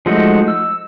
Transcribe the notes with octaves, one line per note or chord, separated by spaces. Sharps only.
F3 G#3 A3 D#4 F#4
E6